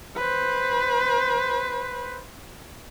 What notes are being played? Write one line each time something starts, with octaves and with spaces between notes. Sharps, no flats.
B4 C5